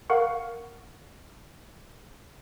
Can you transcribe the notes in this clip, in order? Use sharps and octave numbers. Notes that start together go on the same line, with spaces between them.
A#4 F5 F#5 C#6